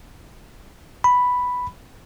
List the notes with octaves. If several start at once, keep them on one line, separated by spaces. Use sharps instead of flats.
B5